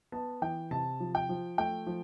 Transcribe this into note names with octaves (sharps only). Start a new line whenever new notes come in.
B3 A5
E3 G5
C3 A5
F3
G5
F3
A3 G5
F3